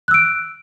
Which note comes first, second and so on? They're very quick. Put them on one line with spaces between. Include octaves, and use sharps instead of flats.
F#6 E6 D7